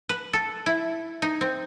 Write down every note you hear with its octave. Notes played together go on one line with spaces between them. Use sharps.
B4
A4
E4
D#4
C4